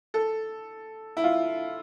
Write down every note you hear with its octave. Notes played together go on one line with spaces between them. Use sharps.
A4
E4
F4